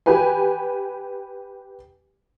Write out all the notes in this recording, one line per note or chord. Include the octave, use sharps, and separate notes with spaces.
G4 B4 G#5